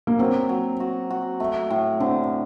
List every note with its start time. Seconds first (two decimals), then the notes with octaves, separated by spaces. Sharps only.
0.07 A#3
0.19 F#3 C4
0.49 F#3
0.80 F#4
1.10 F#4
1.40 A3
1.70 A2
2.00 D3 C4